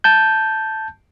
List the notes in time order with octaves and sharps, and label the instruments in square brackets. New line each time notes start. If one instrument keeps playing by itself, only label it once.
[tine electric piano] A5 G6